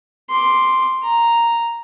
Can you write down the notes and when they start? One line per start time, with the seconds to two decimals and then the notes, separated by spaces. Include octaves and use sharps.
0.30 C6 D6
1.04 A#5